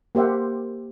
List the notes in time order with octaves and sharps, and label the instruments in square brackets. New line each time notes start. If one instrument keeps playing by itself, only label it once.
[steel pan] A#3 G4 C5 E5 F#5